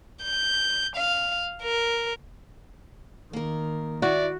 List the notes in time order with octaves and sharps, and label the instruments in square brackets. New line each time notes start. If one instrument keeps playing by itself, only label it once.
[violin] G6
F5
A#4
[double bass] D#3 [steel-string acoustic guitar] A#3 A#4
[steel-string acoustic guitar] E4 [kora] F#4 [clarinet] D5